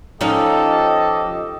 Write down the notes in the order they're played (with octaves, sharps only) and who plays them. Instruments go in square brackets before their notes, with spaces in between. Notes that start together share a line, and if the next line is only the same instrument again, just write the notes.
[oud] F3 C#4 D#4 [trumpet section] G4 D#5 [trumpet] A4